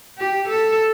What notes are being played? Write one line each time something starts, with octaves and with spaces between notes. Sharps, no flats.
G4
A4